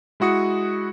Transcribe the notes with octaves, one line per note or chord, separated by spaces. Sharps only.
G#3 E4 F#4 D#6 C#7